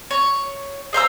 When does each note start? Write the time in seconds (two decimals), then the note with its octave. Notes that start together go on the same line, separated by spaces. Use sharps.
0.11 C#5
0.93 G#4 C5 A#5 E6